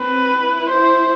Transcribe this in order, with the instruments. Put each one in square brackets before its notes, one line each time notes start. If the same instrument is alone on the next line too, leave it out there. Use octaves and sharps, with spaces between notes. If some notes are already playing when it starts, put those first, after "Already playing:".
Already playing: [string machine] C4 [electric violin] B4
[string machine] E4
[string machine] E4 [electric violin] C5